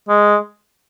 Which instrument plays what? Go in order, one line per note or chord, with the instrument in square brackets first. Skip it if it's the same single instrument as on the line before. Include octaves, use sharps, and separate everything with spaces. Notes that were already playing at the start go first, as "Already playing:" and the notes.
[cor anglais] G#3